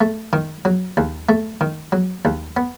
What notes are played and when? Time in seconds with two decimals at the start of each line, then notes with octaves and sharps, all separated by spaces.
0.01 A3
0.33 D#3
0.65 F#3
0.97 D#2
1.29 A3
1.61 D#3
1.92 F#3
2.25 D#2
2.57 B3